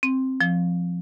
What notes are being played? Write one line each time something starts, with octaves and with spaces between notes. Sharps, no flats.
C4
F3